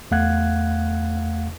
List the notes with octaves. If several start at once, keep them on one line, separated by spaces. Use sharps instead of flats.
E2 A3 F5 F#5 F#6 G#6